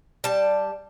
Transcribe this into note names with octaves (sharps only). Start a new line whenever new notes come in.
G3 A5